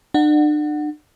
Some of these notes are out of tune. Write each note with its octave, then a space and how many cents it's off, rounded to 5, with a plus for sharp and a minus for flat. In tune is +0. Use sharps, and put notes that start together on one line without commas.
D4 +40 F#5 +0